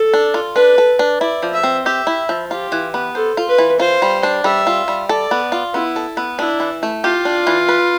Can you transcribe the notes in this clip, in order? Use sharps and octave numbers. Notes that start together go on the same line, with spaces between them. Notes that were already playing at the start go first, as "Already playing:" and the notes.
Already playing: A4
D4
F4
D4 B4
A4
D4
E4 D5
F3
E5
C4
G4 E5
E4
F3
F4 G4
E3
B3
A4 C5
F4
B4
E3
F4 C5
G3
D4
G3 E5
F4
G3
A4 D5
B3
F4
B3 E4
A4
B3
D4 E4
E3
A3
F4 G4
D4
E3
B4